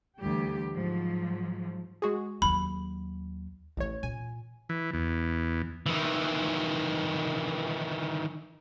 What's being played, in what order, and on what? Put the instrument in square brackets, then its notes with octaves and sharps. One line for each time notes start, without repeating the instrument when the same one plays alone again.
[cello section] D2 E3 G3 G4
G#2 F3 F#3
[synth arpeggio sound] G#3 F#4 G#4
[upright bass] D#2 F#3 [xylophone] B5
[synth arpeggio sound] A1 C#5 [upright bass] A3
[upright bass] A#2 [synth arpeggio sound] G#5
[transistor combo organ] E3
E2
[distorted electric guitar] D#3 E3